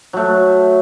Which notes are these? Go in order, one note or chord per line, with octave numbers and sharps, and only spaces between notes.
F#3 A3